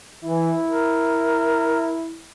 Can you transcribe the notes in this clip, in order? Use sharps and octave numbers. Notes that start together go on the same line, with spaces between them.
E3 E4
A#4